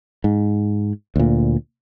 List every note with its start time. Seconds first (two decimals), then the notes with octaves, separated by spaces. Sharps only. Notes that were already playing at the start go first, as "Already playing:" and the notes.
0.24 G#2
1.16 D2 A#2